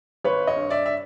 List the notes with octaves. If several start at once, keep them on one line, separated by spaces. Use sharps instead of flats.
G#1 B4 C#5
C#5 D#5
G2
D5 E5
E5